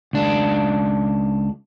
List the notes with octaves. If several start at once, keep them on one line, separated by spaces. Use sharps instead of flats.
C#2 D4